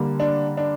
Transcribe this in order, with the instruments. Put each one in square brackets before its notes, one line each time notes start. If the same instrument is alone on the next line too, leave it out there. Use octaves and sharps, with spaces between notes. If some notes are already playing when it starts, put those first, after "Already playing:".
Already playing: [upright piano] D3 G3 A#3
[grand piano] D4
D4